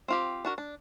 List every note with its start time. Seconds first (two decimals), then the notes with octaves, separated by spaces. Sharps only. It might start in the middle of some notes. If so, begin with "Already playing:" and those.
0.08 C4 F4 G4
0.45 D4 F#4 A#4
0.58 D4